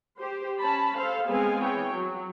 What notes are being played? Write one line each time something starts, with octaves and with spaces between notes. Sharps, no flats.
G4 C5
C#4 A5 B5
A4 C5 F5
G#3 B3 C4 G#4 F5 G#5
E3 C#5 G5
F#3